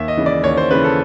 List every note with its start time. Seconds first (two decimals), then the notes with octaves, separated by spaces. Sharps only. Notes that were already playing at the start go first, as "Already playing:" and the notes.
Already playing: D#2 E5
0.08 D#5
0.17 C#3 E3
0.26 D5
0.43 D#2 C#5
0.57 C5
0.71 C#3 E3 B4
0.84 A4